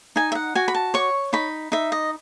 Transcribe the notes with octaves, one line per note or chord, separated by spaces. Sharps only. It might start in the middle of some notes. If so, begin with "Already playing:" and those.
D#4 G#5
E5
F#5
F#4 G#5
B5
A5
C#5 C#6
D#4 B5
D#4 E5
D#5